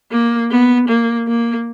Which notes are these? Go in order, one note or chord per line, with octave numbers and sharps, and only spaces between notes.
A#3
B3
A#3
A#3